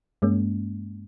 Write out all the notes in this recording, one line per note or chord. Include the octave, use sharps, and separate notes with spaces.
G2 G#3 A#3 C#4